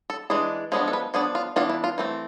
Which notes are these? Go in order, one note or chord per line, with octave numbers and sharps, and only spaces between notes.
A4
E3 G#3 D4 G#4
F3 G#3 B3 D4 G#4
A4
B4
F3 B3 D4 G#4
F4
E3 B3 D4 F4
E4
F4
E3 A3 C4